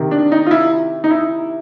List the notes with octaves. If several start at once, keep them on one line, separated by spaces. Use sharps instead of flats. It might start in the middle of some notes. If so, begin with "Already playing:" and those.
Already playing: C3 D#3
D4
D#4
F4
E4
D#4
E4